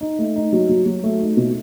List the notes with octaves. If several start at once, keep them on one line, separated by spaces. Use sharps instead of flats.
D#4
A3
D#4
F#3
F#3
F#3
A3
D#4
B2